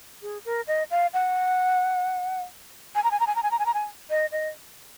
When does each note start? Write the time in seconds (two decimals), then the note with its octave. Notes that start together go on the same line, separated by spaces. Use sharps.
0.22 G#4
0.45 A#4
0.67 D#5
0.91 F5
1.14 F#5
2.95 G#5
3.04 A#5
3.11 G#5
3.20 A#5
3.27 G#5
3.36 A#5
3.43 G#5
3.51 A#5
3.59 G#5
3.66 A#5
3.74 G#5
4.10 D#5
4.32 D#5